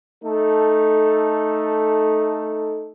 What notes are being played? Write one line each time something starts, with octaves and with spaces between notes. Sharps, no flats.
A3 D#4 A4